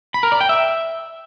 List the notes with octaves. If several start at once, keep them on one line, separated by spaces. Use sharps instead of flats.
B5
A#4
D5
G5
E5